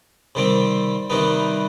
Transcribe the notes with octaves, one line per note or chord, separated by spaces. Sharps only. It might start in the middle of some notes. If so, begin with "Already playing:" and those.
C3 D#3 G3 C4
C3 D#3 G3 B3 D#4